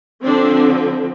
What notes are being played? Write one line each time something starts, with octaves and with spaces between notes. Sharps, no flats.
D3 F3 C4 D4